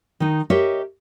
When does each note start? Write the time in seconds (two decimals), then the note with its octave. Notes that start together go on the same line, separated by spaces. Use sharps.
0.20 D#3 D#4
0.50 G4 A#4 C#5 D#5 E5